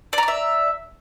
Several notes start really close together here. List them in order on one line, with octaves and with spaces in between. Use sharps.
D5 A#5 D6 E5